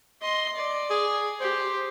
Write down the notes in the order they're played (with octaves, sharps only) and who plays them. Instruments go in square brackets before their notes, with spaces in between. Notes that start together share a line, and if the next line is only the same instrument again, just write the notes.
[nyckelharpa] D#5 C6
D5
[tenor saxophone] G#4
[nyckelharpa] G4 [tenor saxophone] C5